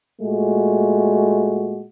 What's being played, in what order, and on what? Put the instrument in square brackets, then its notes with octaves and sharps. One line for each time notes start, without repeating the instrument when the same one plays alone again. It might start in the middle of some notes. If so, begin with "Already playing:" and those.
[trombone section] A#2 G#3 A3 F#4